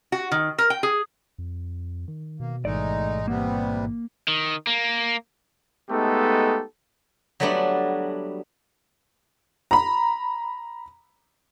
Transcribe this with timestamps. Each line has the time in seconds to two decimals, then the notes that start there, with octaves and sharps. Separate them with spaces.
0.12 F#4
0.31 D#3
0.58 A#4
0.70 G5
0.83 G#4
1.38 F2
2.08 D#3
2.40 B2 A#3
2.65 A1 G#2 B2 E3 G#3 A3 D#4 D5
3.28 C3 G3 A#3 B3
4.28 D#3
4.67 A#3
5.90 G#3 A3 B3 D#4 G4 A4
7.40 F#3 G3 A3 B3 D4 F#4
9.71 A#5 B5